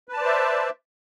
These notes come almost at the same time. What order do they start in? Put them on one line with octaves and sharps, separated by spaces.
B4 A5 D5 C5 E5